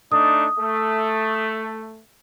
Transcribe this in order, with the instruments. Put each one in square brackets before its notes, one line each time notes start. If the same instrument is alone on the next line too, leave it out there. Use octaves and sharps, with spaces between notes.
[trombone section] A3 D4 D#4 [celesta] D#6
[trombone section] A3